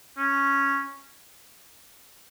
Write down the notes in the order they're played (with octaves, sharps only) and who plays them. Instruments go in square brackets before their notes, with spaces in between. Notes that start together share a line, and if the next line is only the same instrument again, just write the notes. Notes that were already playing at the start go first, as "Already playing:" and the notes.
[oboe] C#4